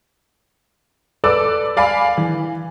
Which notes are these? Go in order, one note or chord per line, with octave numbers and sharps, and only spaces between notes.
A4 B4 D5 D6 E6
D5 F5 G#5 B5
E3